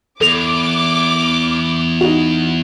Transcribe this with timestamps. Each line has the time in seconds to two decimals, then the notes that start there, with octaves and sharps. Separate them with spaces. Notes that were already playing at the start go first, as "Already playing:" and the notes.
0.21 E2 A4 D6 F7
2.01 D#4 F#4